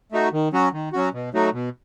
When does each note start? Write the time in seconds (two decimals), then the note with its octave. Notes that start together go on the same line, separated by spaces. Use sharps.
0.12 A3 D#4 F#4
0.32 D#3
0.53 F#3 C#4 F#4
0.73 D#3
0.93 F#3 C#4 F#4
1.13 B2
1.34 F#3 A3 D#4 F#4
1.53 B2